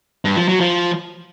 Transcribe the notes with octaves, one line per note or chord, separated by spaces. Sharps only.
G2
F3
F#3
F3